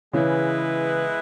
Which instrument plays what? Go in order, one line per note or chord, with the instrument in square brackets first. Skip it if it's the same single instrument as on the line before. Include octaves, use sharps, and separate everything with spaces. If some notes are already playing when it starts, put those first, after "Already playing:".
[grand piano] C#3 E3 [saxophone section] G#3 B3 E4 B4